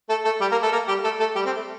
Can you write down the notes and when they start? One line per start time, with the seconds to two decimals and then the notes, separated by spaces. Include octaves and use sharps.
0.09 A3 A4
0.25 A3 A4
0.41 G3 G4
0.51 A#3 A#4
0.62 A3 A4
0.72 A#3 A#4
0.88 G3 G4
1.04 A3 A4
1.19 A3 A4
1.35 G3 G4
1.45 C4
1.56 A3